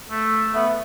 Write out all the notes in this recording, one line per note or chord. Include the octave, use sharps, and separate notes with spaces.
A3
A3 B3